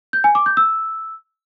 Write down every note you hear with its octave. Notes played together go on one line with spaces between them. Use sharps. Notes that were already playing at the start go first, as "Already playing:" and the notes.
G6
G#5
D6
G6
E6